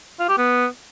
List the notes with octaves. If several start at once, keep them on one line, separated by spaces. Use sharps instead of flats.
F4
G4
B3